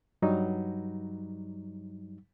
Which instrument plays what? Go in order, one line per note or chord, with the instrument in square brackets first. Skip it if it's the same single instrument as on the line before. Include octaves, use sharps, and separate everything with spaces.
[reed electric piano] G2 F#3 G3 D#4